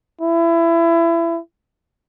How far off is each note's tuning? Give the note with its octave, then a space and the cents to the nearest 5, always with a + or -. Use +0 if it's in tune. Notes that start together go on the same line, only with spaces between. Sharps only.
E4 +25